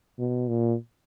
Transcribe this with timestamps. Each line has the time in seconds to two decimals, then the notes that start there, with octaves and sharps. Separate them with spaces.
0.19 B2
0.48 A#2